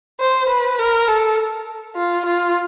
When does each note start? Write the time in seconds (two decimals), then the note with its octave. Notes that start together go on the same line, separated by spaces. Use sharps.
0.20 C5
0.49 B4
0.78 A#4
1.08 A4
1.96 F4
2.25 F4